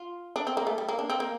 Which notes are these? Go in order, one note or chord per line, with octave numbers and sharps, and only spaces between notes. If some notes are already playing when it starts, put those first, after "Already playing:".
Already playing: F4
D4
C4
A#3
A3
G3
A#3
D4
C4
A#3